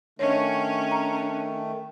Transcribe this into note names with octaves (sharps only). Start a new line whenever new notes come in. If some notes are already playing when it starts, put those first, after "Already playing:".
D#3 A3 C#4 D4 C#5 D#5
A#5